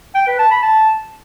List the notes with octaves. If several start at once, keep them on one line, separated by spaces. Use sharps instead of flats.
G5
B4
A5
B5
A5